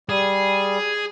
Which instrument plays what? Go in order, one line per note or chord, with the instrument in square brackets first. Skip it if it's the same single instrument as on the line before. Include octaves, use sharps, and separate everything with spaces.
[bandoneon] G3 [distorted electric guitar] G#4